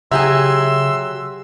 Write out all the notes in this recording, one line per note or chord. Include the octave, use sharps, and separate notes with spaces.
C#3 F#3 G4 G#4 E5 C6 E6